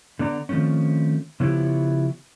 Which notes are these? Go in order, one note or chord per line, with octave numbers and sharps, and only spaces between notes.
D3 B3 D5 A#5
D#3 F3 A3 C4 C#4
C#3 F3 B3 E4 G4 C#5